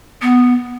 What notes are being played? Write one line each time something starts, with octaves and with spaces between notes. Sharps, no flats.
B3